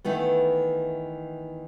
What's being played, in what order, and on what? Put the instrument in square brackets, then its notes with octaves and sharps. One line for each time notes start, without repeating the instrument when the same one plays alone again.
[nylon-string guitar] D#3 E3 A3 B3